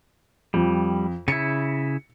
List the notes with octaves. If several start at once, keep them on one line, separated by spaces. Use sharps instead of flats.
F2 G3
C#3 E4 C#7